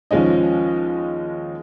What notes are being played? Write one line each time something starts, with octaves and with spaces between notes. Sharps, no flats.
D#2 F3 G#3 C#4 D#5